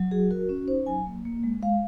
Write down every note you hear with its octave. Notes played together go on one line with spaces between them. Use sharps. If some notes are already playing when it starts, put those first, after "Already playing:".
Already playing: F#3
F#4 G#4
F#4 A#4
C#4
D#4 C5
F#3 G#5
A#3
A#3
G#3
G#3 F5